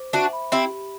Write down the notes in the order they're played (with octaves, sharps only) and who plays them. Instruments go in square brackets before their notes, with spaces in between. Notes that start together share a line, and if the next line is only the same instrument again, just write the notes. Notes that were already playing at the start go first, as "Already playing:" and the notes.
Already playing: [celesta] C5 D6
[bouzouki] D4 F#4 [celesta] E5
[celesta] B5
[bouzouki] C4 E4 [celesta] G4
[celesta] G4